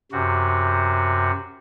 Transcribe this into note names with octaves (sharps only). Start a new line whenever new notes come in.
F#2 C3 F#4